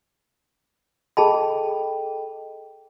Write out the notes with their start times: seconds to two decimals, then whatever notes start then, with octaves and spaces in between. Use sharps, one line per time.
1.17 G#4 A4 D#5 G5 A5 B5